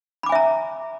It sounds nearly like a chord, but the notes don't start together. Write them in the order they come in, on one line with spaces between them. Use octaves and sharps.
B5 D6 G#5 E5 A#5